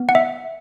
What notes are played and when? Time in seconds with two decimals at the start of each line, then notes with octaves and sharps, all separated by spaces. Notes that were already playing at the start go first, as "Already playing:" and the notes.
Already playing: B3
0.09 F#5
0.15 E5